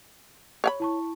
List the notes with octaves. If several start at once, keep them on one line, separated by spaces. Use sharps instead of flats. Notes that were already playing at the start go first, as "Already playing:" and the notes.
C#5 F5 B5
E4 A5 C#6